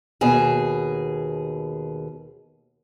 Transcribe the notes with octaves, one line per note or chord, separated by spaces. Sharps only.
D#2 B2 G#4